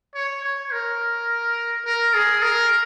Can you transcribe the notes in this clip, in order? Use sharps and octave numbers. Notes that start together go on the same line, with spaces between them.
C#5
C#5
A#4
A#4
G#4
A#4